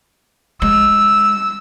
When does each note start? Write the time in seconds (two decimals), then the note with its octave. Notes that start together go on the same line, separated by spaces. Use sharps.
0.62 G#3 E6